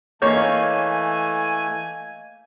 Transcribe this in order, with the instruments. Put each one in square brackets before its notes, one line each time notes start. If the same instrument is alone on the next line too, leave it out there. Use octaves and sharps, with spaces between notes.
[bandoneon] E3 A3 [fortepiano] A#3 C#5 [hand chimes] D#5 F5 G6 [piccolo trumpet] G#5